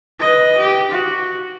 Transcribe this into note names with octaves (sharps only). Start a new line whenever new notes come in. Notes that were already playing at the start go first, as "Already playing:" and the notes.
B4 D#5
G4
F#4